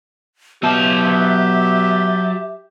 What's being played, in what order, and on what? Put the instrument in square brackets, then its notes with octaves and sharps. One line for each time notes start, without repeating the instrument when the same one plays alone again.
[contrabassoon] B2 [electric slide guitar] F#3 A5 [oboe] G4 [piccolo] E5